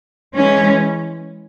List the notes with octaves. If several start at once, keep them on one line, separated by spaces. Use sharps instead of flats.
E3 G#3 C#4